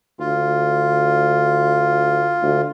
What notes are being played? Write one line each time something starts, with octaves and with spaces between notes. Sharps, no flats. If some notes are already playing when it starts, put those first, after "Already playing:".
D2 F4
D2